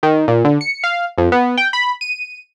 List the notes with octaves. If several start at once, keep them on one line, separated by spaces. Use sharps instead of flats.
D#3
A#2
D3
C#7
F5
F2
B3
G5
B5
D#7